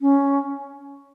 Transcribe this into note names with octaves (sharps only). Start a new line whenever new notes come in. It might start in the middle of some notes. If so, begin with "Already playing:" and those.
C#4